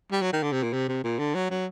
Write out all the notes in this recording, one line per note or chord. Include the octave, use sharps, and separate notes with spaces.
G3
F#3
D#3
D3
C3
A#2
C3
C3
A#2
D3
F#3
F#3